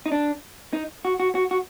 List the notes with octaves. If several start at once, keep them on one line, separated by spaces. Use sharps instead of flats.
D#4
D4
D#4
F#4
F#4
F#4
F#4